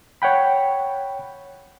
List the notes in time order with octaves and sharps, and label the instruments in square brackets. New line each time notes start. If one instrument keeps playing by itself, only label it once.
[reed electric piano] C#5 F#5 G5 B5